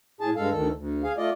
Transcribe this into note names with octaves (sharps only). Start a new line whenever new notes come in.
A2 G#4 A5
G2 G#3 A4 F5
D2 D#3 A4
D2
G#4 F5
A3 F4 D5 D#5